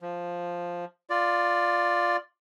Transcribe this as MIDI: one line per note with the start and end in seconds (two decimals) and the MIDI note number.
0.01 0.85 53
1.10 2.17 65
1.10 2.17 74